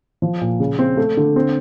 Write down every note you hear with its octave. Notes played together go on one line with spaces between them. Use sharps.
F3
A#2
C#3
C4
A3
D3
C4